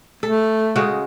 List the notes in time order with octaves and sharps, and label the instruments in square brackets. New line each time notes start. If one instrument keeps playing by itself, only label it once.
[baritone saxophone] A3 [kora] A4
[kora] C#3 G#3 F#4